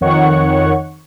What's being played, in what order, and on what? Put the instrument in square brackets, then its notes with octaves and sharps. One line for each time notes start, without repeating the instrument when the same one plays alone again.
[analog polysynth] F2 D#3 C#5 F#5 C#6